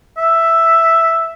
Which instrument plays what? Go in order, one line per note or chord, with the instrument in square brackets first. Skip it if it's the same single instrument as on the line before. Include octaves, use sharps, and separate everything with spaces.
[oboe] E5